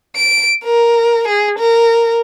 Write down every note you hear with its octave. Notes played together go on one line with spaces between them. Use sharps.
D7
A#4
G#4
A#4